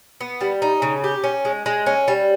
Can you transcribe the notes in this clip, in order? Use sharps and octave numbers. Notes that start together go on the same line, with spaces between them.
B3
G3
D#4
C#3
G4
C#4
G#3
G#3
C#4
G3